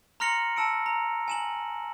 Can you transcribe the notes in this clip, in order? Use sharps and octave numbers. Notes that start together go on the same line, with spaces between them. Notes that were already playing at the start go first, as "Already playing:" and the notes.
A#5 C6 F6 A#6 C#7 F#7
A5 E6 C#7 D7
A#5
G#5 E7 F#7